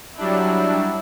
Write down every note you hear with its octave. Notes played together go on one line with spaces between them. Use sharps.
F#3 G3 D4 E4